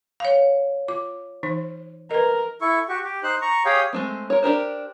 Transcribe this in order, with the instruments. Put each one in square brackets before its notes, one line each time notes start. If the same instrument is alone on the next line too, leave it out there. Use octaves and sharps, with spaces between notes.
[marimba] C#5 F5
[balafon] F4 D6
E3 D#4 C5
[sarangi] A#4 [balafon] B4 D#5
[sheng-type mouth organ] E4 A4 C#6
F#4 G4 C#6
G4
D#4 C5 F#6
A#5 C#6
G4 G#4 C#5 F5 G5
[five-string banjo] G#3 A3 C4
A#4 C#5
D4 G4 A#4 C5